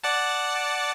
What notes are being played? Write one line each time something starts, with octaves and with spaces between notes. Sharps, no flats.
D5 F#5 A5